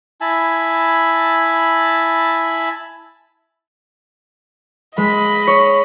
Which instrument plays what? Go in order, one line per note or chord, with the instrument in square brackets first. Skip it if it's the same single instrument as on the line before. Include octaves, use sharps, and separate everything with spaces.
[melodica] E4 G#5 A5 B5
[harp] G#3 [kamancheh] D#5 B5
[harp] C#5